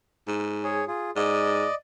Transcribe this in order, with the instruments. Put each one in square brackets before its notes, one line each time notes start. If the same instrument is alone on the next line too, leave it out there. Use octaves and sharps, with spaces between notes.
[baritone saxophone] G#2
[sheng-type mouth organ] G#4 C#5
F4 G#4
[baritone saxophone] G#2 [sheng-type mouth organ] D5 D#5